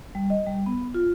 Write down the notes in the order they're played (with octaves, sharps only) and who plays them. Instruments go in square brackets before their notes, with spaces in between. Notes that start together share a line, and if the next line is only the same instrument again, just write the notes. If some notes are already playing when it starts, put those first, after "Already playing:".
[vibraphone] G3
D#5
G3
B3
F4